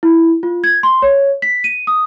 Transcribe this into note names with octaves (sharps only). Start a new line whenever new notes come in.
E4
F4
G#6
C6
C#5
B6
D#7
D#6